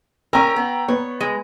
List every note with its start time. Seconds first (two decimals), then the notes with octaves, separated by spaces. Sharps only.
0.33 C#4 A#4 G5 A#5 E6
0.56 B3
0.88 B3 C#5
1.21 G#3